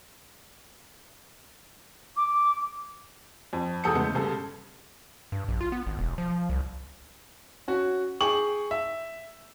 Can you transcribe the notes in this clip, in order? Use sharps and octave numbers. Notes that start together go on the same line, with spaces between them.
D6
F2
E1 E2 A4 D#6 G6 C#7
C#3 G#3 A3 B3
G2 C#3 A4
G2
A#1
F4
B3
G#1
E1
F3
C2
C#4 F#4
G#4 G5 C#6 F#7
E5